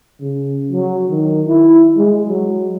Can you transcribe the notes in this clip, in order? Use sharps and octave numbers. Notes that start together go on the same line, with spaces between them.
C#3
F#3
D#3
E4
G#3
F#3